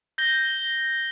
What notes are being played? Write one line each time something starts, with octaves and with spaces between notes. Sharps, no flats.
G6 A#6 G7